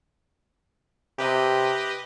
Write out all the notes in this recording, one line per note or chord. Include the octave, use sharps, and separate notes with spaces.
C3 G4 B4 D#5